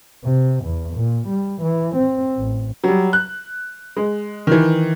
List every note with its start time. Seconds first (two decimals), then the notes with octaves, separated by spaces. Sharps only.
0.24 C3
0.64 E2
0.95 A#2
1.28 G3
1.62 E3
1.96 C4
2.37 A1
2.84 F#3 G3
3.13 F#6
3.97 G#3
4.47 D#3 E3